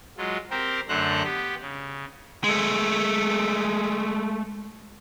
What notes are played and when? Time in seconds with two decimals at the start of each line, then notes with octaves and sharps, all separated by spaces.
0.18 F#3 G#3 F4
0.50 C4 G4 A#4 C5
0.89 F#2 D3 A3 C5 A#5 F#6
1.23 B3 G4
1.62 C#3
2.44 G#3 A3